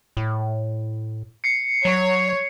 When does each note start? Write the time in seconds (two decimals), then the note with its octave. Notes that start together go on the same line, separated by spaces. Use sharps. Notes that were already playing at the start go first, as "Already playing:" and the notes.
0.17 A2
1.44 C7 C#7
1.85 F#3 C#5